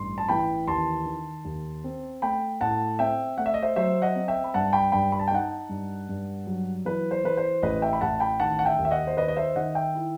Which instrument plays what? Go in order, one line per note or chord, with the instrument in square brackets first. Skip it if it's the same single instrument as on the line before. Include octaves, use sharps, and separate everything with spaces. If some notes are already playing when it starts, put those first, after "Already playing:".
Already playing: [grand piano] A1 G2 C6
A5
E3 G5 B5
D#2 A5 C6
D#3
D#2
C4
A3 G5 B5
A2 F#5 A5
C4 E5 G5
A3 F#5
E5
D#5
C5 E5
F#3 C5 E5
D#5 F#5
C4
E5 G5
B5
G2 F#5 A5
G5 B5
G2 G5 B5
B5
A5
G5
D#4 F#5 A5
G2
G2
F#3
E3 B4
C5
E3 B4
C5
A1 B4 D#5
E5 G5
B5
A1 F#5 A5
G5 B5
D#3 F#5 A5
F#5
E5 G5
D#2
E5
D#5 F#5
C5
D#3 B4 D#5
D#5
C5 E5
D#3 D#5 F#5
E5 G5
E4